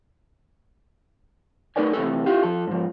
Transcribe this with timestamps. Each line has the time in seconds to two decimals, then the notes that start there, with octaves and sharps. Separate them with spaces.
1.76 A3 D#4 A#4 B4 D5 G#5
1.93 C3 D#3 E3 A3 A4
2.26 E4 F4 G4
2.43 F3 A4
2.67 G#2 F3